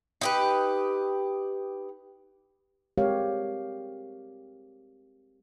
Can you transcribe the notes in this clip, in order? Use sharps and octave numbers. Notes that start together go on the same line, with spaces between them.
D#4 G4 B4
G#3 C4 G4 A#4 C#5 F5